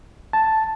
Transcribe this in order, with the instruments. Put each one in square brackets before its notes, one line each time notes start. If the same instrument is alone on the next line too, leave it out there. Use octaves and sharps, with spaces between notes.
[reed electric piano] A5